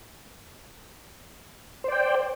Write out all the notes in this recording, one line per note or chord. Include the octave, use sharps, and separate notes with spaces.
C5 D5 G5